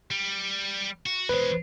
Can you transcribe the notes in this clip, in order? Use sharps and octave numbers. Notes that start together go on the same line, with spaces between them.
G3
F#4
E2 G#3 B4 C5